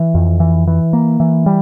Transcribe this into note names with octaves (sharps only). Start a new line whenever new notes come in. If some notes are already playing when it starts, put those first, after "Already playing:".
Already playing: E3
F2
E3
E3
A#3
E3
G3